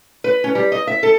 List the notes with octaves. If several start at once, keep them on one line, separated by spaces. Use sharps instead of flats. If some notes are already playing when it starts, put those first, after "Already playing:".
B4
C#4
G3
D#5
E5
A4